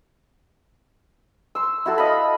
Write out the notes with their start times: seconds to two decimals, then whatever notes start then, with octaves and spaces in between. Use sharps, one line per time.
1.55 C6 E6
1.86 E4 F#4 A4
1.98 D#5 F5 B5